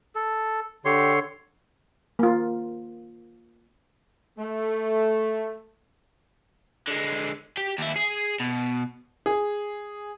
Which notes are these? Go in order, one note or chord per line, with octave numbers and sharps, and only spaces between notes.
A4
D3 G4 C#5 C6
A#3 F4
A3
D3 G#3
G4 G5
D#2 E4
G#4
B2
G#4